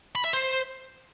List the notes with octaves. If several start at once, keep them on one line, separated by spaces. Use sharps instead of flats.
B5
E5
C5